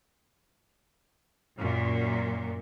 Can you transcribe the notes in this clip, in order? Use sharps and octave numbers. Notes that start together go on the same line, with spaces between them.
F#2 A#2